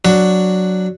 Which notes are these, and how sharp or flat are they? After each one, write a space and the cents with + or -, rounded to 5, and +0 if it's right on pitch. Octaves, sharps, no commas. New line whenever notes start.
F#3 +0 D4 +0 F#4 +0